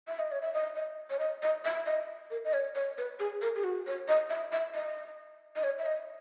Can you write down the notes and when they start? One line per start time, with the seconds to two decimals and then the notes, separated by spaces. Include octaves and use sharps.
0.08 E5
0.19 D#5
0.32 C#5
0.42 E5
0.54 D#5
0.76 D#5
1.10 C#5
1.19 D#5
1.42 D#5
1.65 E5
1.86 D#5
2.31 A#4
2.45 D#5
2.53 C#5
2.75 C#5
2.98 B4
3.20 G#4
3.42 A#4
3.56 G#4
3.64 F#4
3.87 C#5
4.09 D#5
4.30 E5
4.53 E5
4.75 D#5
5.56 D#5
5.64 C#5
5.79 E5
5.86 D#5